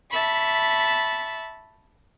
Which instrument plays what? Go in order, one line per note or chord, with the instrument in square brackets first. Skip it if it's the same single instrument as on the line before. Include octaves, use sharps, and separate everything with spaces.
[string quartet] E5 A5 B5 C#6